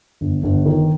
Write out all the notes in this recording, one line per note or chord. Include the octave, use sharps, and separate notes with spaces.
G1
G1
D#3